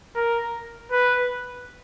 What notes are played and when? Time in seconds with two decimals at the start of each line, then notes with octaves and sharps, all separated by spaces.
0.15 A#4
0.92 B4